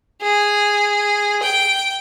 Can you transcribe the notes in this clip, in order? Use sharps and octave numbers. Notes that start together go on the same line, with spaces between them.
G#4
G5